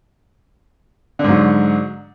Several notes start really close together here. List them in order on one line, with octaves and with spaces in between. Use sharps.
D3 G#2 F#3